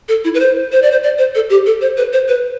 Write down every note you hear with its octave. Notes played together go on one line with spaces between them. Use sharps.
A4
E4
B4
C5
C5
D5
C5
D5
C5
A4
G4
A4
C5
B4
C5
B4